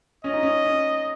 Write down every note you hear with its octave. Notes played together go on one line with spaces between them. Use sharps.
C#4 D#5
D#4
C#4
C#4